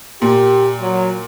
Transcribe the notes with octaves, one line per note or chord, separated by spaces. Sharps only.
A#2 G4
F#3